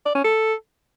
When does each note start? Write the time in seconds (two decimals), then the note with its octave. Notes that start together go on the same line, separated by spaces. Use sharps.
0.06 D5
0.15 C#4
0.24 A4